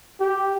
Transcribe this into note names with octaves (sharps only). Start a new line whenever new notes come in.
G4